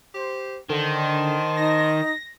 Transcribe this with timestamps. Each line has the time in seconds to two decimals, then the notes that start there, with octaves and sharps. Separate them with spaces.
0.15 G4 C5
0.70 D3 D#3 C5 A5 C6
1.57 D#4 A#6